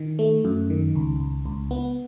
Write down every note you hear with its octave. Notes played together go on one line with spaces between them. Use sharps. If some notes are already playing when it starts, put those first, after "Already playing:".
Already playing: D#3
A3
F#2
D#3
C#2
C#2
C#2
B3